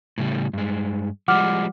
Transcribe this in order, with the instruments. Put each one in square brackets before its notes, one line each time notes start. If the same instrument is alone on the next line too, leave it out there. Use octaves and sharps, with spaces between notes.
[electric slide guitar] A2 C#3 G3
G2 G#3
[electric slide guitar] F3 G3 G#3 [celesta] F#5 D6 F6